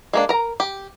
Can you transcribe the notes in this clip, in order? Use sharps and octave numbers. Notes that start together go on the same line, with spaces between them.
G#3 A#3 D4
A#4 A#5
G4